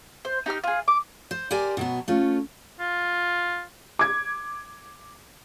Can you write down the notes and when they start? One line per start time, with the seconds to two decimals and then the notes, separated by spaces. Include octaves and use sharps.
0.25 C5
0.46 D#4 G4 A#5 F6
0.64 F4 G#4
0.88 D6
1.31 C5
1.51 G4 A#4 C5 D5 G#5
1.77 B2 F#3 B3
2.08 A3 C#4 F4
2.80 F4
3.99 D6 G#6